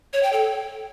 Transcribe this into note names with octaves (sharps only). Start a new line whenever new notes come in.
C#5
G5
A4